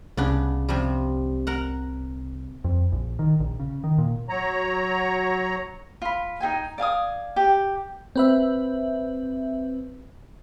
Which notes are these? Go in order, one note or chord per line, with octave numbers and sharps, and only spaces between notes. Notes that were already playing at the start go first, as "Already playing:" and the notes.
C2 C#3 B3 D4
C3 F3 G3
A#4 F#5
F2
A#1
D#3
A#1
C#3
D#3
A#2
F#3 C#5 A#5
F4 B5
D#4 G#4 G5 G#5
D5 F5 G#5 D#6
G4
C4 B4 E5